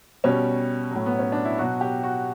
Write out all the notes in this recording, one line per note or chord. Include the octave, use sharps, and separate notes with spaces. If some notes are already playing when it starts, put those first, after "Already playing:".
B2 G3 C#4
A2 F#3
B3
C#4
D4
E4
B2 F#3 F#4
G4
F#4